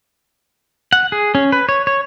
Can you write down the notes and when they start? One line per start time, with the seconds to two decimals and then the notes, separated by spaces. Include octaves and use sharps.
0.93 F#5
1.12 G#4
1.35 C#4
1.52 B4
1.69 C#5
1.87 C#5